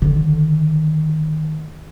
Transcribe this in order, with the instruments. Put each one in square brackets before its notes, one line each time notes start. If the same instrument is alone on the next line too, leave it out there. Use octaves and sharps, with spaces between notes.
[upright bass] D3 D#3